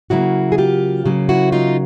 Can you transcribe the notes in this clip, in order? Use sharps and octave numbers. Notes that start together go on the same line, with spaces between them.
C#3 F#3 A#3 E4 F#4
G#4
F4 G4
C#3 F#3 A#3
E4 F#4
D#4 F4